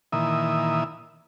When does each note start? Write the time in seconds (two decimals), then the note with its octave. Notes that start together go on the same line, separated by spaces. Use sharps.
0.12 A#2 D#3 E3 E5 D#6